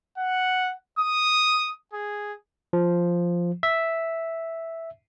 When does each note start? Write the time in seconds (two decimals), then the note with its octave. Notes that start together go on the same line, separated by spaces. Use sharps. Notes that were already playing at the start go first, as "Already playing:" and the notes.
0.18 F#5
0.99 D#6
1.93 G#4
2.73 F3
3.63 E5